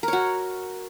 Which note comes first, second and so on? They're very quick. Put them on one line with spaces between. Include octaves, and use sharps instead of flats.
A#4 C#5 F#4